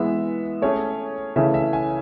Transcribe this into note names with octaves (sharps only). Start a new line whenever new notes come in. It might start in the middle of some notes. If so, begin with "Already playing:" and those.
Already playing: E3 G#3 B3 E5
A3 C#4 G#4 C#5
C#3 E3 A3 C#4 E5
E5
G#5